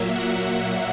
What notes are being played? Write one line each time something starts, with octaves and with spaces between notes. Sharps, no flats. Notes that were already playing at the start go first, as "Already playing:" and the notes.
Already playing: A#2 F#3 A#3 E5
F#5